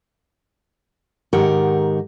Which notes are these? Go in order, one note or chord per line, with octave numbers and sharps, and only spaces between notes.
G#2 D#3 G4 A#4 F#5